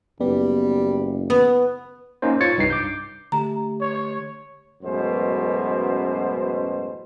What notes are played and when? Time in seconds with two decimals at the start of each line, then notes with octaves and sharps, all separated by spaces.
0.21 F#1 G3 B3
1.30 B3
2.22 A#3 C#4 D#4 C5
2.40 F4 C#5 G#6 A6 C#7
2.57 C2 G2 D#4 C7
2.70 D6 G6
3.32 D3 A3 G4 A#5
3.81 C#5
4.83 A1 F#2 B2 G#3 C5